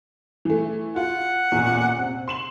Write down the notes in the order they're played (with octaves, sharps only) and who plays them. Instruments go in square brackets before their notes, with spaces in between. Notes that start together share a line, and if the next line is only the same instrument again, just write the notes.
[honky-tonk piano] E3 A3
[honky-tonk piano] F4 [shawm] F#5
[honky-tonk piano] A1 E2 A#2
C3
C6 E7 F#7